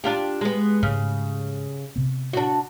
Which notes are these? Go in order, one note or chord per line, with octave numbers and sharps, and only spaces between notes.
D4 F4 G4
G#3 B3
G#2 C#3 A3
C3 B3
D4 F#4